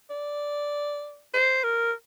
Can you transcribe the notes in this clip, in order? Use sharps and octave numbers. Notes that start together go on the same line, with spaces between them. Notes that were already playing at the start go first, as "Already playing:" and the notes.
D5
C5
A#4